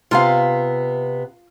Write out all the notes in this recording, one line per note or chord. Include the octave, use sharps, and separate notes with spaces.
C3 B3 F4 F5